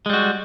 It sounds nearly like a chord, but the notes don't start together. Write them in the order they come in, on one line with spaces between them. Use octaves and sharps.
G#3 G3 F#4